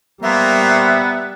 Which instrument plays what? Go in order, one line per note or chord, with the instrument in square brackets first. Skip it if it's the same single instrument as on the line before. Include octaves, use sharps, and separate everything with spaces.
[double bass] G3 [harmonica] A#3 C5 A#5 [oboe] B3 [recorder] E5